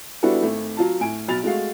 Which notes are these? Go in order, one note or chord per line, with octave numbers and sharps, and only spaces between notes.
G3 B3 D4 E4 F#4 A4
G#1 A3
F#3 F4 A5
A2 G#5 D7
B1 F#3 B5 A6 F7
G#3 A3 F#4 F5